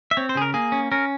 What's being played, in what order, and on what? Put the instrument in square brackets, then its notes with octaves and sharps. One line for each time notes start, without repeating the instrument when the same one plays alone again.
[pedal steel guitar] E5
C4 C#5
C5
C#3 G#4
A#4
A#3 G#4
C#4
C#4 A#4